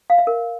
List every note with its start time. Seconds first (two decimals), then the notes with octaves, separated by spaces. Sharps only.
0.10 F5
0.18 E5
0.27 A#4